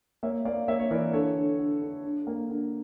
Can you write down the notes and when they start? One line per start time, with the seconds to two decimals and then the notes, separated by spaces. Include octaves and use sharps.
0.23 A#3 C#5 E5
0.45 A#3 D5 F5
0.68 A#3 C#5 E5
0.79 C#5
0.91 E3 A#4 D5
1.13 D3 A4 C#5
1.36 D3
1.59 D3
1.81 D3
2.04 D3
2.27 A#3
2.50 D3